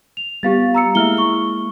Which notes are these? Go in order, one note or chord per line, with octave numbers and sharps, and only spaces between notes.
F7
G3 B3 F4 G4 F5 A6
A#5 E6 C#7
G#3 A#3 E4 E5 F6 G7
C#6 G7